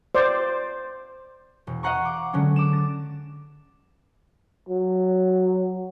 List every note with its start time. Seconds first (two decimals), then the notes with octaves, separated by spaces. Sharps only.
0.15 C5 D5
1.67 E1
1.83 D#5 F5 F#5 A#5 C#6
2.05 D6
2.33 D3 F#3 G#3 C#4
2.56 D6 E7
2.73 A6 A#6
4.69 F#3